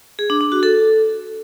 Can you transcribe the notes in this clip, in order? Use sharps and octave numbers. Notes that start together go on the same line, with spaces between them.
G#4
D4
D4
F#4
A4